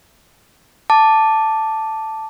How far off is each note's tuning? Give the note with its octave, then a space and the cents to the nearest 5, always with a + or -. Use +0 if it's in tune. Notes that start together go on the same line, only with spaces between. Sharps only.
A5 +0 D6 +0